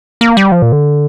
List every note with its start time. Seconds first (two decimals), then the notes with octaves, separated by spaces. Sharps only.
0.21 A#3
0.37 G3
0.52 F3
0.62 A#2
0.72 D3